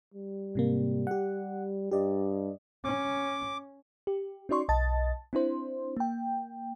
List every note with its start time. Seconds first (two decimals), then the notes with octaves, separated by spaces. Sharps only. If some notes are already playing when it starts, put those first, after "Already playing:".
0.14 G3
0.55 G#2 C3 A#3
1.07 G4 F#5
1.91 G2 G4 D5 D#5
2.84 C#4 D6
4.07 G4
4.49 C#4 D#4 F#4 D5 C6 C#6
4.69 B1 D#5 A5 A6
5.33 C4 D4 E4 C5
5.97 A#3 G5